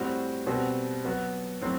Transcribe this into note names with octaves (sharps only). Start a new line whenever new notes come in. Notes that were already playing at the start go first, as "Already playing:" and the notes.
Already playing: A2 G3 C4 F#4
B2 G3 C4 F#4
F#3 B3 F#4
A2 F#3 C4